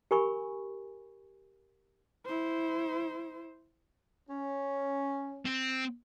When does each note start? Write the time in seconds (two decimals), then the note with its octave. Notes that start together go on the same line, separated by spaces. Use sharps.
0.11 G4 A#4 G#5 B5 C#6
2.26 E4 C5
4.30 C#4
5.45 C4